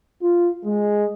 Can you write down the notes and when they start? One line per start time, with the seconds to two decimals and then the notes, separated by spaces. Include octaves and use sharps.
0.21 F4
0.64 G#3